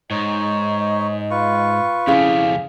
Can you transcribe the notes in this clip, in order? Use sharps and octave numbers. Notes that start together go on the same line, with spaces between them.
G#2 D#4 C#5 D#5
F4 B4 C#6
F2 C#3 C#4 E4 G#4 F5